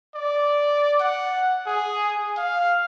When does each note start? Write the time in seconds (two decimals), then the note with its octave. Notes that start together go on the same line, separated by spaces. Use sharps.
0.15 D5
1.00 F#5
1.66 G#4
2.37 F5